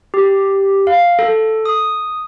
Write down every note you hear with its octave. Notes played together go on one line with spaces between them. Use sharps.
G4
F5
A4
D#6